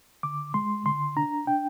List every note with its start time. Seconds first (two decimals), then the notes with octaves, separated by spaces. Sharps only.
0.23 D3 D6
0.54 G#3 C6
0.86 D3 C6
1.16 D4 A#5
1.47 D4 G5